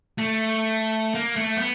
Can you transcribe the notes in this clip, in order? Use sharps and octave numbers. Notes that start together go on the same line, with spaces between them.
A3
A#3
A3
B3